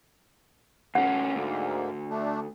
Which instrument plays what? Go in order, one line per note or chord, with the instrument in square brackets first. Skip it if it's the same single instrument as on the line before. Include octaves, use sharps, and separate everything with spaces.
[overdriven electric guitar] D2 C#4 [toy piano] F#5
[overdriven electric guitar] D2 [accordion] G#2 D3 A#3
[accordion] A3 D4